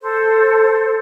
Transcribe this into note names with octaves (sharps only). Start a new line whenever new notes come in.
A4 C5